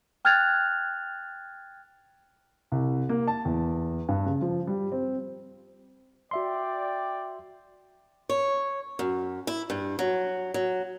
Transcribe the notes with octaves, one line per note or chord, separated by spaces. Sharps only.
G5 F6 F#6 G#6 A6 F7
C2
A#3
A5
E2
G2
C#3
F3
G3
C4
F#4 D5 E5 G5 C6
C#5
F#2
E4
G2
F#3
F#3